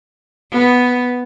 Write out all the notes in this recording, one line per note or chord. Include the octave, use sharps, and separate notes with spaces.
B3